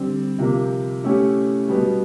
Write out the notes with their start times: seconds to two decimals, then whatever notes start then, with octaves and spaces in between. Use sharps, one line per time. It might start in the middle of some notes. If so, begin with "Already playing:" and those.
Already playing: D3 G3 C4
0.38 C3 F3 A#3
1.04 A3 C#4 E4 G4
1.68 B2 G3 B3